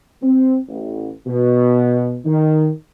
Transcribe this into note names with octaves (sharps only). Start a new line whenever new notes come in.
C4
A1
B2
D#3